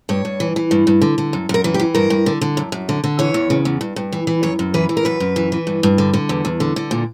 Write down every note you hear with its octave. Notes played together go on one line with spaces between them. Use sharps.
G2 C#5
G2
E3
E3
G2
G2
D3
D3
F#2
F#2 A#4
E3
G4
E3
G2 A#4
G2
D3
D3
F#2
F#2
D3
D3
E3 C#5
E2
C#3
E2
G2
G2
E3
E3
F#2 C#5
F#2
E3 B4
E3
A#4
F#2 B4
F#2
E3
E3
G2
G2
D3
D3
E2
E2
D3
D3
A#2